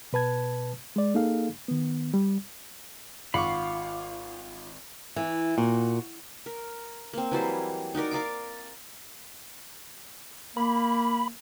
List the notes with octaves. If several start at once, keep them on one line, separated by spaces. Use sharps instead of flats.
B2 B4 A5 G#6
G#3 D5
A#3 D#4 G#4 A4 F5
D#3 B3
G3
G#1 F4 F#5 B5 C#6 D6 C7
E3
A#2 F#4
A#4
A#3 C4
E3 F#3 G3 C5
D#4 F#4 A#4 D5
A#4 D5 F5 D6
A#3 B5